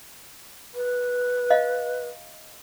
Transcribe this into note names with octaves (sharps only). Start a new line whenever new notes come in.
B4
D#5 F5